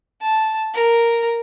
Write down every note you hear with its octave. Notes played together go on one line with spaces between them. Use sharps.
A5
A#4